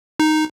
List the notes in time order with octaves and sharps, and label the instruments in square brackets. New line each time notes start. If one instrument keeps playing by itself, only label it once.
[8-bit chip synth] D#4